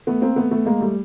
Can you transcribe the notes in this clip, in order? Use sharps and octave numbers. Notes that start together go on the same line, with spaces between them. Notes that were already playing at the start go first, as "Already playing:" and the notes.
A3 B3
A#3 C4
A3 B3
A3 B3
G#3 A#3
G3 A3